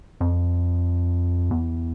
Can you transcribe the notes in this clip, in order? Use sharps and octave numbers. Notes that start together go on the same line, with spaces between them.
F2
E2